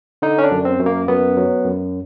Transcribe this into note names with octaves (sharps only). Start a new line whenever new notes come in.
D3 D#4
C#4
D4
F#2
C4
F#2
A#3
F#2 B3
F#3
F#2